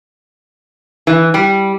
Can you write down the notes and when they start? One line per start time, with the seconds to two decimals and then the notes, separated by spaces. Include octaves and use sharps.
1.07 E3
1.34 G3